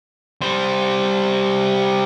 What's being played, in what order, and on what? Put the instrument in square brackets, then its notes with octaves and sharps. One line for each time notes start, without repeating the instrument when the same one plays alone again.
[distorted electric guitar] G3 C5